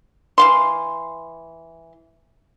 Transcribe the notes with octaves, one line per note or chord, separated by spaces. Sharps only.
E3 F5 C6